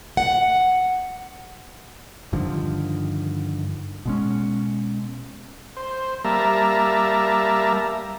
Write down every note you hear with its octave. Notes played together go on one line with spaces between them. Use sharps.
F#5
G2 D3 D#3 F3
B2 G#3 C#4
C5
G3 A#3 E5 A5 A#5